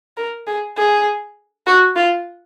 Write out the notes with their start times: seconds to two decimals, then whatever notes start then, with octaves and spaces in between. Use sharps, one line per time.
0.17 A#4
0.47 G#4
0.77 G#4
1.67 F#4
1.96 F4